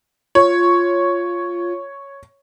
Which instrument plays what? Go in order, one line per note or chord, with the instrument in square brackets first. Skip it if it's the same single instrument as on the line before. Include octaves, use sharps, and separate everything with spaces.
[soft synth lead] F4 [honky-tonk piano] C#5